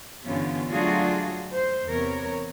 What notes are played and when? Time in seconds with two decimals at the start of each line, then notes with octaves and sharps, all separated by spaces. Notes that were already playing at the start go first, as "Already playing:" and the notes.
0.24 G2 D3 E3 B3 C#4 F4
0.69 F#3 A3 D4 F4 F#4 G#4
1.51 C5
1.86 E2 C3 B3 A#4 C#5